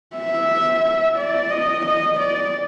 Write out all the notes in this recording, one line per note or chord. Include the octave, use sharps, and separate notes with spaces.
E5
D5
D#5
D#5
D5